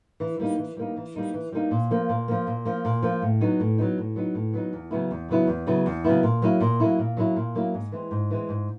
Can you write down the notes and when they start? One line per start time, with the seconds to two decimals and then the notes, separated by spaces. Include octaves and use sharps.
0.20 E3
0.39 G3 A#3 D#4
0.58 E3
0.77 G3 A#3 D#4
0.97 E3
1.15 G3 A#3 D#4
1.34 E3
1.52 G3 A#3 D#4
1.71 A#2
1.91 F3 A#3
2.09 A#2
2.28 F3 A#3
2.47 A#2
2.65 F3 A#3
2.85 A#2
3.02 F3 A#3
3.22 A2
3.41 F#3 B3 D#4
3.60 A2
3.78 F#3 B3 D#4
3.98 A2
4.16 F#3 B3 D#4
4.34 A2
4.53 F#3 B3 D#4
4.73 E2
4.91 C#3 F#3 B3 E4
5.11 E2
5.29 C#3 F#3 B3 E4
5.47 E2
5.67 C#3 F#3 B3 E4
5.86 E2
6.04 C#3 F#3 B3 E4
6.23 A#2
6.42 F#3 A#3 C#4 E4
6.61 A#2
6.80 F#3 A#3 C#4 E4
6.99 A#2
7.17 F#3 A#3 C#4 E4
7.36 A#2
7.55 F#3 A#3 C#4 E4
7.74 G#2
7.92 E3 G#3 C4
8.11 G#2
8.31 E3 G#3 C4
8.49 G#2